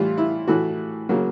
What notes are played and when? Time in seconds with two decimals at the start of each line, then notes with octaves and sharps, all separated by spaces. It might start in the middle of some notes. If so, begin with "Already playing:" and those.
Already playing: A2 E3 G3 F4
0.18 E4
0.48 A2 E3 A3 F#4
1.09 C#3 F#3 A#3